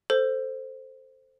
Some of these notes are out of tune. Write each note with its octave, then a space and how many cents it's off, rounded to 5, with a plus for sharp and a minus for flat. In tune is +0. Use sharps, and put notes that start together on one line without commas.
A4 +10 C5 +0